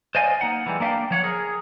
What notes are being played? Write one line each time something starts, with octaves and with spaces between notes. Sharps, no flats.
C5 D5 D#5 F5 G#5
A#3 D#4 F#5
E3 G3 G#3
A#3 D4 E5 F5 G5
F3 C#5 F#5
G#4 A#4